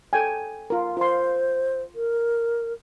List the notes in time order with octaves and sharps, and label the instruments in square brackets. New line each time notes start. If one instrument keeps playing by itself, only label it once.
[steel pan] A4 G5 G#5
F4 A#4
[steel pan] F4 C6 [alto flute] C5
[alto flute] A#4